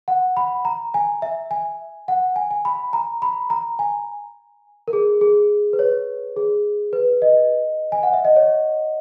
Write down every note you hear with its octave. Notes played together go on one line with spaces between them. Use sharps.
F#5
B5
A#5
G#5
E5
G#5
F#5
G#5
G#5
B5
A#5
B5
A#5
G#5
A#4
G#4
G#4
B4
C#5
G#4
B4
D#5
G#5
F#5
E5
D#5
C#5